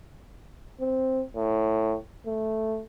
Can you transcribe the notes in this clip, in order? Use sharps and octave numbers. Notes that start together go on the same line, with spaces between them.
C4
A2
A3